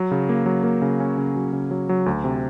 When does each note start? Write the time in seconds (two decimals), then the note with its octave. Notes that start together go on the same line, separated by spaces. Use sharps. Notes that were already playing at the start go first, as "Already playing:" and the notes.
Already playing: F#3
0.11 C#3
0.29 A#3
0.46 F#3
0.64 A#3
0.82 C#3
1.00 C#4
1.18 C#3
1.36 F#3
1.53 C#3
1.71 F#3
1.89 F#3
2.06 D2
2.24 C3